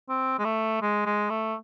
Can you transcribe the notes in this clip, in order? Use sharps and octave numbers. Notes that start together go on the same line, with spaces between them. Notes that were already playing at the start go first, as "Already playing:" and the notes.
C4
G#3
A3
G#3
G#3
A3